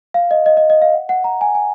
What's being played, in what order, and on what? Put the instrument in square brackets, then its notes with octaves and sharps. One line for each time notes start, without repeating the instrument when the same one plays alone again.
[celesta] F5
D#5
D#5
D#5
D#5
F5
F#5
F#5
A#5
G#5
G#5